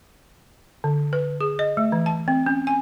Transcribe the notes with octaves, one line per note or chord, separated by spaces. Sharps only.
D3
B4
G#4
D#5
A3
E3
A5
C4
C#4
G#5